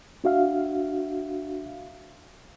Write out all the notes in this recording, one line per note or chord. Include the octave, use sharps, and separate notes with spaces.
D4 F#4 E5 F5